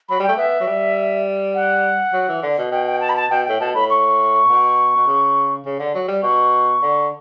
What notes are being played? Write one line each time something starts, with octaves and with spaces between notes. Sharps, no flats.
F#3 B5
G3 G5
A3
B3 E5
F#3
G3
F#5
F#3
E3
D3
B2
B2 G5
G5
A5
B5
A5
B2 G5
A2 G5
B2 A5
A2 B5
C#6
B2
B2
C#3
C#3
D3
F#3
G3
B2 C#6
D3